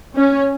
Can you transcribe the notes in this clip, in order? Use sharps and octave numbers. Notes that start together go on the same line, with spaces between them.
C#4